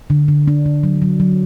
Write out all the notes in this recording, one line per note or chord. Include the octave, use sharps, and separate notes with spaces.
D3
D3
D4
D3
F#3
F#3
F#3